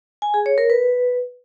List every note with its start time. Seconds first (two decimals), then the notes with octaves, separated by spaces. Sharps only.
0.22 G#5
0.34 G#4
0.46 C#5
0.58 A#4
0.70 B4